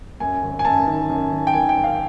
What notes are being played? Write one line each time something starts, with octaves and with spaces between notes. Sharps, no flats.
F#2 G#5
G#1
G#5
F#2 A5
D#3
F#2
D#3
G5
D#3 G#5
G5
G#1
F5